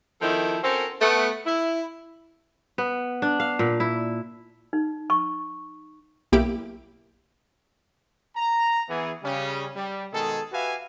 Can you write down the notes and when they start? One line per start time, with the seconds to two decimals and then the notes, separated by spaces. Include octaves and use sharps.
0.21 D#3 F3 C4 D#4 E4 A4
0.63 C4 C#4 F#4 A4 A#4 C5
1.01 A3 B3
1.46 E4
2.78 B3
3.22 D4
3.40 F5
3.59 A#2
3.80 E4
4.73 D#4
5.10 C#6
6.32 B1 A#3 E4 G4 D7
8.36 A#5
8.88 E3 B3 G#4
9.23 C#3 G3 C#4
9.75 G3
10.12 B2 D#3 G#3 G#4 A4
10.52 F#4 G4 B4 E5 F5 G#5